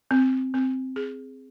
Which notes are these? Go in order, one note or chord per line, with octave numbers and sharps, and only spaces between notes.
C4
C4
G#4